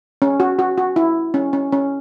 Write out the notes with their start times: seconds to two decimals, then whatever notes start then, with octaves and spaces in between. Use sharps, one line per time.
0.22 C#4
0.40 F#4
0.59 F#4
0.78 F#4
0.96 E4
1.34 C#4
1.53 C#4
1.72 C#4